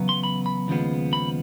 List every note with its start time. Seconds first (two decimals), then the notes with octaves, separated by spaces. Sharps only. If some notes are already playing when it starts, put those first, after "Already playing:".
Already playing: E2 C#3 F#3 B3
0.09 C6
0.23 B5
0.46 B5
0.68 D#2 C#3 F3 G#3 B3
1.13 B5